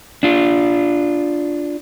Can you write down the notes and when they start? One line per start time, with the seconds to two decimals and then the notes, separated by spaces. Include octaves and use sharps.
0.23 D4 F4